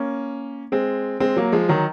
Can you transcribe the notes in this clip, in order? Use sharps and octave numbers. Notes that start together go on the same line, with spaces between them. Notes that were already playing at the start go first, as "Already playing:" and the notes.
Already playing: A#3 C#4
G#3 C4
G#3 C4
F#3 A#3
F3 G#3
D#3 F#3